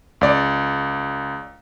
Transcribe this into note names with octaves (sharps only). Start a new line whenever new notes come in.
C#2 D5